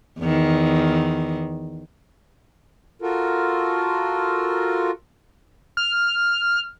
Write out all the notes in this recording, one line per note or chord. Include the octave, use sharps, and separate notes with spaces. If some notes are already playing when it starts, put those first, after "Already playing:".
E2 D#3
F4 F#4 A4 A#4
F6